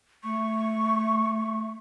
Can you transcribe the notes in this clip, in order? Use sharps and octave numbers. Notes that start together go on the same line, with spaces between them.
A3 C#6